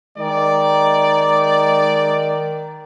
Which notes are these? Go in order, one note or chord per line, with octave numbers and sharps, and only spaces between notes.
D#3 G#3 D#4 D5